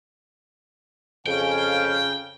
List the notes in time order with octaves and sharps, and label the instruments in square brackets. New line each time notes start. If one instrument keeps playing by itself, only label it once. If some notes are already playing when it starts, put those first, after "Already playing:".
[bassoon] F2 [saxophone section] C#3 [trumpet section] C#4 F5 G#5 [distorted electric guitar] G5